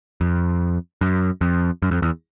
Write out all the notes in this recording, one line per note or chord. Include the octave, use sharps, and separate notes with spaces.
F2
F#2
F2
F#2
F2
E2